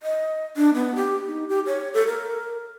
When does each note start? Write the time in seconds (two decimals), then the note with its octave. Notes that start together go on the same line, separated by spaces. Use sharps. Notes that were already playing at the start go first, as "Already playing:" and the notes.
0.03 D#5
0.56 D4
0.74 B3
0.95 G4
1.26 D#4
1.49 G4
1.67 C#5
1.94 A4
2.07 A#4